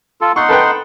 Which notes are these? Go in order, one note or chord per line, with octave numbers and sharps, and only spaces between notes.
F4 A4
D#4 F#5 C6 C#6
A4 B4 G5